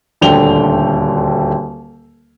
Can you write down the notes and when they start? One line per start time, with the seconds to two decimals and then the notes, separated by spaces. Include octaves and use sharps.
0.21 D#1 D2 D3 G5 F7 G7